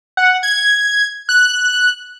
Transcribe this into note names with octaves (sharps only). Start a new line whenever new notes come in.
F#5
G#6
F#6